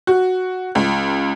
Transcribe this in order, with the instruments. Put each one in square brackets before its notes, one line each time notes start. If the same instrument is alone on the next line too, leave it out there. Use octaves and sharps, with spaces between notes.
[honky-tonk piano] F#4
C#2